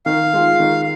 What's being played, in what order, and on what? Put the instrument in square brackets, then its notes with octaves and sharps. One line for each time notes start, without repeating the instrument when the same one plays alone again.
[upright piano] D#3 [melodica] F5
[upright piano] G#3 F4 G#4
D#3